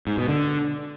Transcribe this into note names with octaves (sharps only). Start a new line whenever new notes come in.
G#2
B2
D3